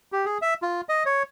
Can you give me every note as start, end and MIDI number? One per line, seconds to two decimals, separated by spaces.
0.12 0.25 67
0.25 0.38 68
0.42 0.54 76
0.62 0.81 65
0.89 1.03 75
1.06 1.23 73